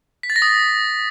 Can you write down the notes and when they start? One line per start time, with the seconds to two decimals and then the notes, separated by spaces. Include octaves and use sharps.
0.23 B6
0.30 A6
0.36 A#6
0.42 D#6